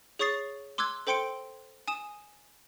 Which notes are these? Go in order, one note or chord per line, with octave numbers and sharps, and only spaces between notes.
G#4 C#5 C#6 D#6 A6 C7
C6 D6 E6 F#6 G#6
A4 C5 G5 C6 C#7 D7
G#5 D#6 E7